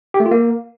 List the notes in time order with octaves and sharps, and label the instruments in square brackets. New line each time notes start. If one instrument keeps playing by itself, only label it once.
[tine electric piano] G4
A3
F4
A#3